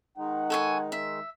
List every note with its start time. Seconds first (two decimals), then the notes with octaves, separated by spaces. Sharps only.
0.18 D#3 G#3 D#4 F#5
0.50 A4 C#5 G#5
0.92 E5